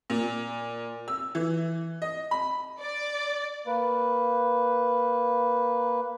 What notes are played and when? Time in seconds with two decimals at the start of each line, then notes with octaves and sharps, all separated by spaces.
0.10 A#2
1.08 E6
1.35 E3
2.02 D#5
2.31 B5
2.79 D5
3.67 A#3 B4